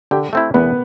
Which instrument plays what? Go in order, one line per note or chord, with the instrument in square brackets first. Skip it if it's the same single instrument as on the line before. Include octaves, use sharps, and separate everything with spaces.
[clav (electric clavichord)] D3 [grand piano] G4 G5
[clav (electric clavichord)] A3 C4 E4
[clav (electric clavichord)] E2 [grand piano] B3 B4